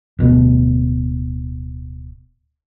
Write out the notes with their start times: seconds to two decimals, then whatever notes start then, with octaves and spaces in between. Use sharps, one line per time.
0.19 D1 B2